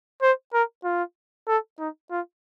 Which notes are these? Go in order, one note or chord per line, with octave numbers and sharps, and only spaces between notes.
C5
A#4
F4
A4
D#4
F4